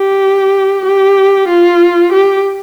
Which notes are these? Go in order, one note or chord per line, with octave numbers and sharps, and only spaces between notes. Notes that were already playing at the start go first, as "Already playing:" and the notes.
Already playing: G4
G4
F4
G4